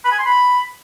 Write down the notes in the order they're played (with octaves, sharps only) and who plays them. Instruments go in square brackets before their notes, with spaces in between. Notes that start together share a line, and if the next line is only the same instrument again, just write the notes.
[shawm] B5
G#5
C6
B5